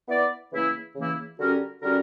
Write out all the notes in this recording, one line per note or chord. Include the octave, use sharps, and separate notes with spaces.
B3 E4 B4 D5
C#3 E3 A#3 E4
C#3 E3 A#3 E4
D3 G3 C#4 F#4 A#4
D3 G3 C#4 F#4 A#4